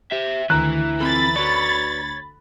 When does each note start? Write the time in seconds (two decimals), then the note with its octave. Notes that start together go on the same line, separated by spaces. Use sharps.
0.12 G4 C5 E5
0.50 D2 D#3 E3 E4 A#5 F#6
1.00 C4 F4 A4 B5 A6
1.36 F#4 B4 C#5 D5